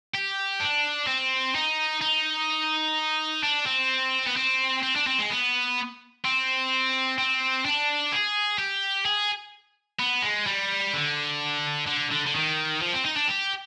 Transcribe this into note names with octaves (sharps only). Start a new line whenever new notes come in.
G4
D4
C4
D#4
D#4
D4
C4
B3
C4
C4
D4
C4
G#3
B3
C4
C4
D4
G#4
G4
G#4
B3
G#3
G3
D3
D3
D3
D3
D#3
F3
C4
D#4
D4
G4